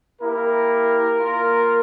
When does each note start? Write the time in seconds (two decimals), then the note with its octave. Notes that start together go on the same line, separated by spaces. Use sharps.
0.20 A#3 E4 G4 A#4
1.19 A#3 F4